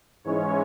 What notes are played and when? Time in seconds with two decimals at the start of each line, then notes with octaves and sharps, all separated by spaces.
0.24 G#2 E3 G#3 C#4 C#5